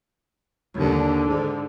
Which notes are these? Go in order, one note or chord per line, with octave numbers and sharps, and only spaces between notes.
D#2 D3
G#2